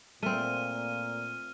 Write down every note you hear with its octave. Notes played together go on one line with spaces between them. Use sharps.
A#2 A3 C4 F6 D#7